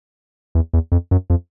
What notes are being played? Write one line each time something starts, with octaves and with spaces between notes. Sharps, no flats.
E2
E2
F2
F#2
F2